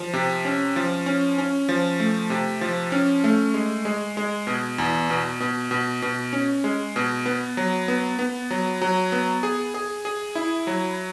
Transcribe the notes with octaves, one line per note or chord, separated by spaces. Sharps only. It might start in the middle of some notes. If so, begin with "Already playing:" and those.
Already playing: F3
C3
C#4
F3
C#4
C#4
F3
A3
C3
F3
C#4
A3
G#3
G#3
G#3
B2
E2
B2
B2
B2
B2
C#4
G#3
B2
B3
F#3
B3
B3
F#3
F#3
B3
G#4
G#4
G#4
E4
F#3